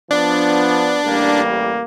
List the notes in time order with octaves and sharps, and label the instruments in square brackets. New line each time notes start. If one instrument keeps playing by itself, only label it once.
[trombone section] F3 B3 [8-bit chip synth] D4
[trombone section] A1 G3 A#3